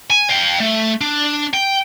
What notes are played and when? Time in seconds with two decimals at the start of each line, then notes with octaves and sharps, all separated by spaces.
0.10 G#5
0.29 F5 G5
0.60 A3
1.01 D4
1.54 G5